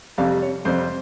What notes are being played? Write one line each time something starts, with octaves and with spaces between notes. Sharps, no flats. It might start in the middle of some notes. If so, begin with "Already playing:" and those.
F2 C3 G3 F5
C#5
F2 C3 G3 C5